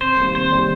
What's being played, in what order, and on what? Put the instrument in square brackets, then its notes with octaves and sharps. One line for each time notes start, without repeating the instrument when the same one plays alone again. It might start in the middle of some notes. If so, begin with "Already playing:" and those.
[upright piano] C3 [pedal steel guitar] C5
[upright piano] D#3 G3 A#3
[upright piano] C3 [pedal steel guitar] C5
[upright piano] D#3 G3 A#3